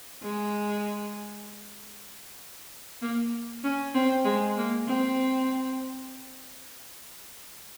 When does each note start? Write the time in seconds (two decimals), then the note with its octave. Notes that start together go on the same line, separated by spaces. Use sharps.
0.23 G#3
3.02 A#3
3.64 C#4
3.94 C4
4.25 G#3
4.57 A#3
4.87 C4